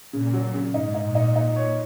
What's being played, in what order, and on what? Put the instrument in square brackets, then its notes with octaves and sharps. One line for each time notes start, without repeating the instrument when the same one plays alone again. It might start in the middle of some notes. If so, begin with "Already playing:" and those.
[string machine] A#2 [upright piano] C#3
[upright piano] F#3
C#3
[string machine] G#2 [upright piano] D#4
[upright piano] D#4
[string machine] A#2
[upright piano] D#4
D#4
C#5